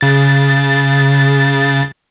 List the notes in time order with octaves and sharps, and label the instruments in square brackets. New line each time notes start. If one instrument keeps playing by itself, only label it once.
[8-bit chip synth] C#3 A6